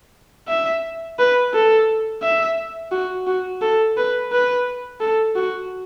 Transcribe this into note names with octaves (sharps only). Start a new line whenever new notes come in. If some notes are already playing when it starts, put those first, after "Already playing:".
E5
B4
A4
E5
F#4
F#4
A4
B4
B4
A4
F#4